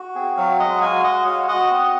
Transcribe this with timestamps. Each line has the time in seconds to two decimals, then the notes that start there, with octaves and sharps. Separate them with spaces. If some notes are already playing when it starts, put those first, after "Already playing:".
Already playing: F#4
0.15 C4 G#4
0.37 F#3 C#5 F5
0.59 G#3 D#5 F#5
0.81 F#4 F5 G#5
1.04 G#3 D#5 F#5
1.26 F#4 C#5 F5
1.48 F#4 D#5 F#5
1.71 C4